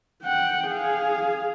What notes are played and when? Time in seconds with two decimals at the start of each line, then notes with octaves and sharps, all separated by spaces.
0.23 F#5 G5
0.67 G#4 F5